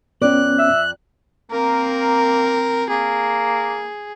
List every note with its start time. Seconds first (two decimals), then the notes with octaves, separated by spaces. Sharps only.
0.22 F2 B3 C#4 D5 F#6
0.58 E5
1.51 A#3 C4 A#4
2.90 A#3 G#4